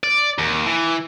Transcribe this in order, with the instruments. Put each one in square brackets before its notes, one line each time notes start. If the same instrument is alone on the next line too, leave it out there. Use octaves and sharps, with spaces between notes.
[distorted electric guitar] D5
D#2
E3